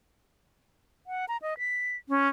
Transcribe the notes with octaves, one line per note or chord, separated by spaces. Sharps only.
F#5
A#5
D#5
B6
C#4